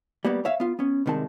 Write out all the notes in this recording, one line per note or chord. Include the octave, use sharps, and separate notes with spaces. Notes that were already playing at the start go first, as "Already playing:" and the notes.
G3 A#3 B3
C#5 E5 F5
B3 F4
B3 C#4
C2 C3 D#3 G#3 A5